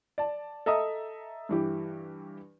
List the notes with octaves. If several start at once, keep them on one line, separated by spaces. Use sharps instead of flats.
D5 A5
A4 D#5 E5 A#5 D#6
G2 E3 G4